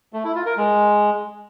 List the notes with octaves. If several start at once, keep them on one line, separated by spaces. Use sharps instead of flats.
A3
E4
F4
A#4
G#3